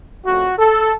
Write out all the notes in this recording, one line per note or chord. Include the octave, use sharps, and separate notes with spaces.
F2 C#3 A3 F#4
A4